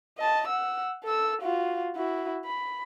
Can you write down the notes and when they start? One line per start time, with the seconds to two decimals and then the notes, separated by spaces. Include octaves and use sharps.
0.18 D#5 A5
0.48 F#5 E6
1.04 A4 E6
1.42 F4 F#4
1.96 E4 F#4
2.45 B5